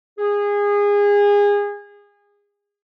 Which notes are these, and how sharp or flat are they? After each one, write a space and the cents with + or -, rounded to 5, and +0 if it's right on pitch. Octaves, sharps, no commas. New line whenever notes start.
G#4 -25